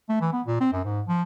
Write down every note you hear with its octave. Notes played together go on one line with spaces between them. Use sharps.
A3
E3
B3
A#2
C4
F#2
G#2
F3